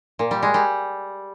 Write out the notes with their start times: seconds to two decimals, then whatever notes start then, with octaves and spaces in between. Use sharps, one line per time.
0.19 A#2
0.31 G3
0.43 G#3
0.54 G3